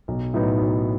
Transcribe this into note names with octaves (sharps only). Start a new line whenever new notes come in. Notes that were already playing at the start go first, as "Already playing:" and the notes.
B1
A2 F#3 B3 D#4
B1